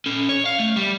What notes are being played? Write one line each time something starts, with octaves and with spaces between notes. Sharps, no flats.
C#4 A4
C#5
F5
A3
G3